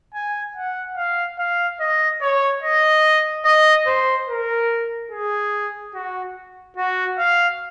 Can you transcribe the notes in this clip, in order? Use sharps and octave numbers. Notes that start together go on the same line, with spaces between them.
G#5
F#5
F5
F5
D#5
C#5
D#5
D#5
C5
A#4
G#4
F#4
F#4
F5